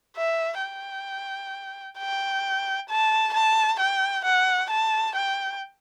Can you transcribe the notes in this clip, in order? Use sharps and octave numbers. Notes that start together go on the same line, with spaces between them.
E5
G5
G5
A5
A5
G5
F#5
A5
G5